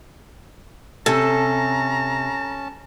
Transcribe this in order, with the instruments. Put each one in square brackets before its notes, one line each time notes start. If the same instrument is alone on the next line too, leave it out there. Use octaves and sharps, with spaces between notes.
[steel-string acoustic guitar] C3 [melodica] C#4 A5 [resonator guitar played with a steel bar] A4 [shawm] A#5